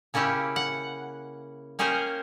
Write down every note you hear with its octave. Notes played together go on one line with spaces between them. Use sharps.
C#3 A#3 C#4 E4 G4
F#5
A#3 C#4 G#4 A#4 C5 G5